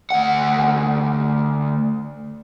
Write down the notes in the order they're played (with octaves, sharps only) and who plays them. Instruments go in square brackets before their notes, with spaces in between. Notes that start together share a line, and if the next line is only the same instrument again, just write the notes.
[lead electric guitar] D2 F#5